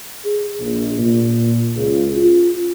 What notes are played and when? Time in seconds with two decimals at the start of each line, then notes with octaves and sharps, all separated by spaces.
0.24 G#4
0.59 A#1
0.98 A#2
1.75 C#2
2.17 F4